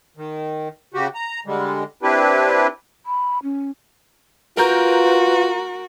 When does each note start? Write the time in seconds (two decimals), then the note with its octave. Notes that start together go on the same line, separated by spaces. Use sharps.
0.17 D#3
0.94 C#3 F#4 G4
1.15 A#5
1.46 D3 G3 G#3
2.03 C4 D4 E4 G4 B4
3.06 B5
3.43 C#4
4.57 F4 F#4 A#4 B4 A#5 G6